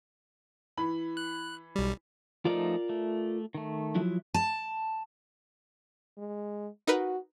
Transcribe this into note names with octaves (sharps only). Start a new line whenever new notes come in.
E3 B5
F#6
B1 G3
F3 A3 D#4 F4 A#4 D5
A3
D#3 A3
F3 F#3 E4
A5
G#3
D#4 F#4 A#4 B4